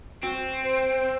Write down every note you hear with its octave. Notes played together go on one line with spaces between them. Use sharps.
C4 F#4
C5